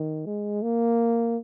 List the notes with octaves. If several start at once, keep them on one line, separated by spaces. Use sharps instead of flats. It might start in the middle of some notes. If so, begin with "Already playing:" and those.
Already playing: D#3
G#3
A#3